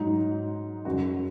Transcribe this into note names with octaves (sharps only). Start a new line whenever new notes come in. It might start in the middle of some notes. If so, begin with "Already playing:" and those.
Already playing: G#2 F#3 D#4
F#2 C#3 F#3 F#4